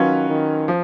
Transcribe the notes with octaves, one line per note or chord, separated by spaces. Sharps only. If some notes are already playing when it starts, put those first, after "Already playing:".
Already playing: D#3 F#3 C#4 F4 B4
D#3
F3